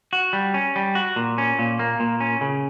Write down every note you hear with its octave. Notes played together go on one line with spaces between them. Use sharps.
F#4
G3
C#4
G3
F#4
A#2
C#4
A#2
A#3
A#2
C#4
C#3